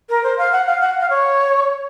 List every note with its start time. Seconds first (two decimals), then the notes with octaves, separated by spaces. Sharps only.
0.09 A#4
0.23 C5
0.38 F5
0.52 F#5
0.67 F5
0.81 F#5
1.00 F5
1.10 C#5